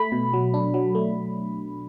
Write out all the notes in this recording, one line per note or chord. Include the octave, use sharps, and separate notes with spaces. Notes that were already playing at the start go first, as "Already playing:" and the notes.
Already playing: A3 B5
B2
F#3
D4
F#3
A3